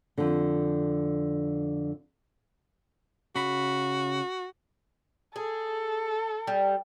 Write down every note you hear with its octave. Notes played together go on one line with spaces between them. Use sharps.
F2 D3
C#3 F#4 B5
G#4 A4
G3